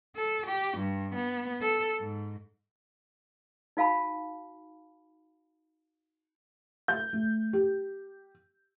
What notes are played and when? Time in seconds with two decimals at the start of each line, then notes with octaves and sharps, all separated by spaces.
0.16 A4
0.46 G4
0.77 G2
1.14 B3
1.61 A4
2.00 G#2
3.77 D#4 F#4 F5 A5 B5
6.88 G6
7.13 A3
7.53 G4